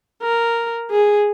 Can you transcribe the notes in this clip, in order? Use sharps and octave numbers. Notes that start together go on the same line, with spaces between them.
A#4
G#4